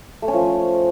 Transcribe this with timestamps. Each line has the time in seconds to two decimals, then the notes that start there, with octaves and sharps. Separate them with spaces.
0.22 A3
0.28 C#4
0.34 F3